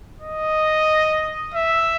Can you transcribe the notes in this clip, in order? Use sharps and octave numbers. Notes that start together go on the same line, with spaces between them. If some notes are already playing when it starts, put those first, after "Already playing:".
D#5
E5